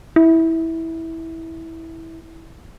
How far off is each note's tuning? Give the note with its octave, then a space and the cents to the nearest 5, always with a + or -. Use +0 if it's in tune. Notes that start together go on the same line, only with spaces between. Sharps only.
E4 -15